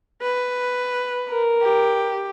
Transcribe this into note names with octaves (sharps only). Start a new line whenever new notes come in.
B4
A#4
G4